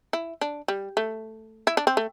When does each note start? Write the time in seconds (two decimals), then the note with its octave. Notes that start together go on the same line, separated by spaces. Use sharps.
0.13 E4
0.41 D4
0.68 G3
0.97 A3
1.67 E4
1.77 D4
1.87 C4
1.97 A3